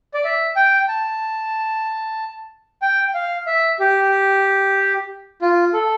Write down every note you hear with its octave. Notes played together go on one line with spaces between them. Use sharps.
D5
E5
G5
A5
G5
F5
E5
G4
F4
A4